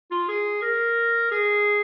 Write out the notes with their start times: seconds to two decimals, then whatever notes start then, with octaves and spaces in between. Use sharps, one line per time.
0.11 F4
0.28 G#4
0.62 A#4
1.31 G#4